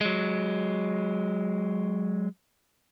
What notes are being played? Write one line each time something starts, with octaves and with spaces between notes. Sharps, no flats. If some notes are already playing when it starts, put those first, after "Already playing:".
F#3 G#3